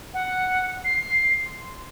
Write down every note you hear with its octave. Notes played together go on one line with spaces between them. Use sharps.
F#5
C7
C6